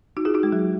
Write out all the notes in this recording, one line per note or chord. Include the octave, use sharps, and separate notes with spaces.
D#4 F#4
F4 G#4
D#4 F#4
G#3
F#3